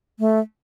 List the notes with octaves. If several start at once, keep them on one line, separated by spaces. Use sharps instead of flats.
A3